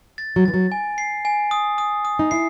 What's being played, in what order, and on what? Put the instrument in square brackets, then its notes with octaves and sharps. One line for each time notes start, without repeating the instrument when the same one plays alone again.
[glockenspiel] A6
[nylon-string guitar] F#3
[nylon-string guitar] E3 [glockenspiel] A6
[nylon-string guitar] F#3
[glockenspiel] G#5
C7
G#5
D#6
D#6
D#6
[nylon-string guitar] D#4
[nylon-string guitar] E4 [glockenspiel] C7